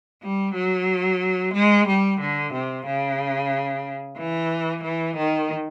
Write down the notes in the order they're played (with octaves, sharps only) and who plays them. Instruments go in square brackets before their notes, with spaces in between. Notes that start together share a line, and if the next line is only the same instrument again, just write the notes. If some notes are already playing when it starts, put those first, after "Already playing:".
[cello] G3
F#3
G#3
G3
D3
C3
C#3
E3
E3
D#3